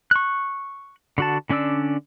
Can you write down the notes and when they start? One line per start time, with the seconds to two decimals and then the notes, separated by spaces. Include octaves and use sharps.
0.11 C#6 F#6
1.18 D3 F#4 A5
1.50 D3 C#4 D4 D5 E6